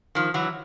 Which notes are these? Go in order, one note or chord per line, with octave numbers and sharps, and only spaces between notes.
D#3 F3
E3 F#3